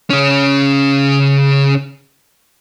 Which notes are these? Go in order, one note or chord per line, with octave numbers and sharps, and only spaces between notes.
C#3 C#4